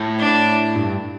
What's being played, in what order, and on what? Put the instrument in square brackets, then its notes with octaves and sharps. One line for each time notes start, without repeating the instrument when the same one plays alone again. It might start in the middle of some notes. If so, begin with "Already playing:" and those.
Already playing: [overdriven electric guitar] A2
[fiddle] D4
[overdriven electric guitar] G2